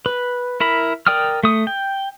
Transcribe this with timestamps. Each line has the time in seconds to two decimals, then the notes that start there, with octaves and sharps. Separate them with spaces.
0.06 B4
0.60 E4 A#4 B5
1.07 A#4 D5 G5 D#6 F6
1.43 A3 D#6
1.67 G5